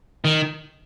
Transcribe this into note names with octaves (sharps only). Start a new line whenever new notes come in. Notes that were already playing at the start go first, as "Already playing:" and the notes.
D#3